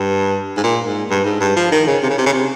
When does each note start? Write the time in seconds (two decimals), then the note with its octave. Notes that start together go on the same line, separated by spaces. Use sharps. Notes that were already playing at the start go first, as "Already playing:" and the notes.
Already playing: G2
0.57 G#2
0.63 A#2
0.86 G#2
1.10 G2
1.25 G#2
1.40 G2
1.56 F3
1.72 D#3
1.87 C#3
2.03 C3
2.10 C#3
2.18 C3
2.26 C#3
2.33 C3